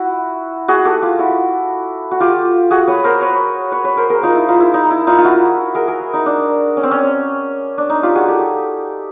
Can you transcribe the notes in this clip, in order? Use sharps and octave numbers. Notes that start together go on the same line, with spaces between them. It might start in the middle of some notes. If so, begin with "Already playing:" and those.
Already playing: E4 F#4
F#4 G#4
G4 A4
F4 G4
E4 F#4
F#4
F4 G4
F#4 G#4
B4 C#5
A#4 C5
B4 C#5
B4 C#5
B4 C#5
A#4 C5
G#4 A#4
D#4 F4
E4
D#4 F4
E4
D#4
E4
D#4 F4
F4
E4 F#4
G#4 A#4
G#4 A#4
D#4
D4
C#4
C4
C#4
D4
D#4
F4 G4
F#4 G#4
G4 A4